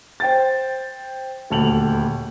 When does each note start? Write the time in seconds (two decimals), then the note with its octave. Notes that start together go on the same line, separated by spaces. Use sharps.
0.20 C5 G5 A6
1.50 D#1 D2 A5 F7 F#7